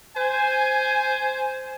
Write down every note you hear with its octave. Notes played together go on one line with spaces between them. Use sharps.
C5 G#5